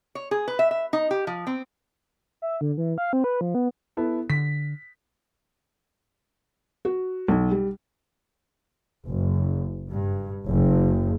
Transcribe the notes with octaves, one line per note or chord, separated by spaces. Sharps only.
C#5
G#4
B4
E5
E5
D#4
G4
F3
C4
E5
D3
E3
F5
C4
B4
F3
B3
B3 E4 A4
D3 B6
F#4
B1
G3
F#1
G2
F#1